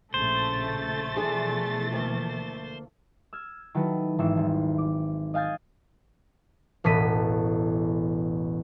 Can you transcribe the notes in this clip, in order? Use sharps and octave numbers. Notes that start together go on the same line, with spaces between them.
A#1 A2 C#3 A3 C5 A6
B2 E3 F3 D4 G#4
D2 A#3
E6 F6 G#6
D#3 F#3 E4 F#4 A4 B4
G#1 D#3 E3 E6 D7
D#1
D6
D#5 F5 G#5 G6 A6
E1 A1 A2 B6 D#7